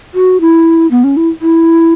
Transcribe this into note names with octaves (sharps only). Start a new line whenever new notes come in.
F#4
E4
B3
C#4
E4
E4